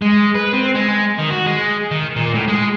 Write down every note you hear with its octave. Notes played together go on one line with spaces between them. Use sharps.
G#3
B4
C4
G#3
D#3
F#4
G#3
D#3
A#2
A2
G#3